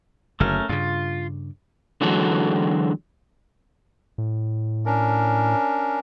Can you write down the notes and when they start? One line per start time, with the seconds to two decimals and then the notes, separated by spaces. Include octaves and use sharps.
0.40 F#1 D3 A3 C#4 A#4
0.69 G2 C#3 F4
2.01 D3 E3 F#3 G#3 F#4 A4
4.18 A2
4.86 C#4 D4 A#4